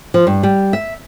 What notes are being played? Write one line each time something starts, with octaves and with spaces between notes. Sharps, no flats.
F3
G2
G3
E5